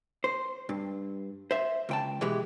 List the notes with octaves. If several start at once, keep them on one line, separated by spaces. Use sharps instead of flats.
C5
G2
C5 E5
C#2 G5 A5
B2 E3 G#3 G4